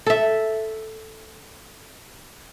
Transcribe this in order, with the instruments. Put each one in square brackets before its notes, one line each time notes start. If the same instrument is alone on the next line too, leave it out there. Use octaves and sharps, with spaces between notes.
[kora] A4 E5